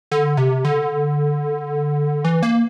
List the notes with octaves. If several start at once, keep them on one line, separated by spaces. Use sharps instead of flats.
D3
C3
D3
E3
A#3